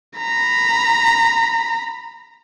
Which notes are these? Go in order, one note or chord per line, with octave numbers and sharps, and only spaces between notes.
A#5 B5